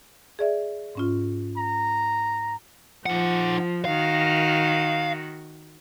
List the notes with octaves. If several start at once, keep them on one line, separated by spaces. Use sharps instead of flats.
G#4 D5 E5
G#2 C#4 F4
A#5
F3 D#4 F#5
D#3 F#4 F5